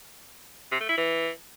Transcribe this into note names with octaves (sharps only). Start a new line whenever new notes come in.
C3
A3
E4
E3